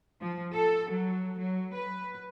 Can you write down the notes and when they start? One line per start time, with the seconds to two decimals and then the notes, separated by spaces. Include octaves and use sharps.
0.21 F3
0.54 A4
0.90 F#3
1.38 F#3
1.73 B4